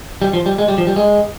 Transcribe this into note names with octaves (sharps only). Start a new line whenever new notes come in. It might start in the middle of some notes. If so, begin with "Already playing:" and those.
G3
F3
G3
G#3
G3
F3
G3
G#3